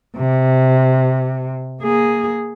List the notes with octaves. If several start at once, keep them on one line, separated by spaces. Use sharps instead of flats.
C3
A#3 G#4